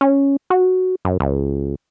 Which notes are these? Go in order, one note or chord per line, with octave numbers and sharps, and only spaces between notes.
C#4
F#4
F#2
C#2